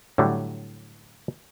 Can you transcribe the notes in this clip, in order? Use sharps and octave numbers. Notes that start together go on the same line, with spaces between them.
A2 D3 F#3 G3